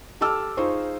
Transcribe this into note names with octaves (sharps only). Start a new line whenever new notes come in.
G4 A4 A5 D6 E6 F6
D#4 F4 G#4 C5 C#6